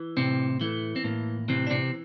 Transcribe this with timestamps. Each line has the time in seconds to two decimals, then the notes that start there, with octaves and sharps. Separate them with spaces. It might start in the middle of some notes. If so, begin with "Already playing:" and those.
Already playing: E3
0.17 A2 C3 C4
0.61 E3 A3
0.96 C4
1.04 A2 A#3
1.48 C3 E3 C4
1.67 D4
1.70 C3 C4